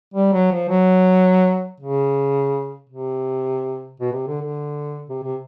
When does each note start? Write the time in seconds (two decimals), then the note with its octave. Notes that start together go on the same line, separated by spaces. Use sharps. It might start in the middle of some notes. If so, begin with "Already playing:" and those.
0.14 G3
0.33 F#3
0.52 F3
0.69 F#3
1.80 C#3
2.90 C3
4.00 B2
4.13 C3
4.28 D3
4.42 D3
5.10 C3
5.24 C3